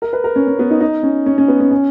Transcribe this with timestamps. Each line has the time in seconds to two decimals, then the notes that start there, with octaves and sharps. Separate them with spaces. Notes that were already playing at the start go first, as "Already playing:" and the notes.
0.02 A#4
0.13 B4
0.24 A#4
0.36 C#4
0.47 C#4
0.59 B3
0.70 D#4
0.81 D#4
1.03 C#4
1.26 C#4
1.38 C#4
1.48 B3
1.60 C#4
1.71 C#4